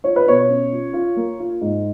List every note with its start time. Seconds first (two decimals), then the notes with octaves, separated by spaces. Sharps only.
0.04 F4 C#5
0.16 B4
0.26 B2 C#5
0.49 C#4
0.72 F4
0.93 F4
1.16 A#3
1.39 F4
1.62 G#2